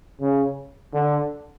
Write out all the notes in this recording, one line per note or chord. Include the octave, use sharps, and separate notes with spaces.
C#3
D3